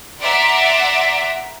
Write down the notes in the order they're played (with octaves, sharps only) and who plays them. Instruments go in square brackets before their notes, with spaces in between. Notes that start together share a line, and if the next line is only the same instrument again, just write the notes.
[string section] D5 E5 F#5 A#5 C6 D6